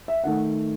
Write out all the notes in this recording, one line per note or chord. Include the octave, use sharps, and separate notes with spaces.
E5
D#3 A3 F#5